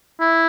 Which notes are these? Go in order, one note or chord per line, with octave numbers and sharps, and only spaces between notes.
E4